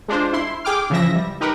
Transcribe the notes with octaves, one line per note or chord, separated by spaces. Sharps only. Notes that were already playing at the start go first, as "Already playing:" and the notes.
G#3 D4 F4 C5
E4 C6
G#4 G5 D6 F6
C#3 E3 F3 E5 A#6
G3
D#4 G4 A#4 B4